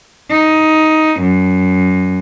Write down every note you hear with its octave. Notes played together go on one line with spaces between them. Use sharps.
D#4
F#2